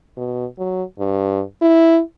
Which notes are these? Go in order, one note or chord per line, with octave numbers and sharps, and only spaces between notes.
B2
F#3
G2
E4